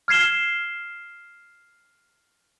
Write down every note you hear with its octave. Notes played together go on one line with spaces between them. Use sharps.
F6 G#6 C7 E7 G7